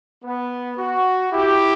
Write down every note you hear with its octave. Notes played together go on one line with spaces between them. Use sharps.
B3
F#4
E4 G4